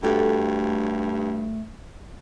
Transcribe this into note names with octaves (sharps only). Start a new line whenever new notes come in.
G2 A3 F#4 G4 A4